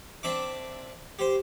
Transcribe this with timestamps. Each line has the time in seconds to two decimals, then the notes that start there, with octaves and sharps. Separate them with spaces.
0.23 C4 D4 E5 D6
1.19 G4 C5